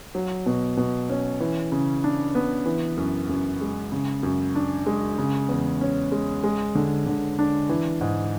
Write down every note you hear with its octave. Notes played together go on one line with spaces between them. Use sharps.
F#3
B2
B2
C#4
E3
C#3
D4
B3
E3
F#2
F#2
G#3
C#3
F#2
D4
G#3
C#3
E2
C#4
G#3
G#3
D3
D3
D4
E3
G#2